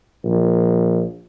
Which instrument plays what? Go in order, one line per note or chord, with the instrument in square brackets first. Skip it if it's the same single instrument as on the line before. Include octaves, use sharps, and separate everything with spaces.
[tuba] A#1